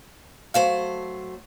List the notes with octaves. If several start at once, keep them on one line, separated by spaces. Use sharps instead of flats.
F#3 A3 C5 F5